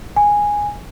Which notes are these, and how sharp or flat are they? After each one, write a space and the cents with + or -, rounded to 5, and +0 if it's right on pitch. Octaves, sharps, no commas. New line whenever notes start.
G#5 -10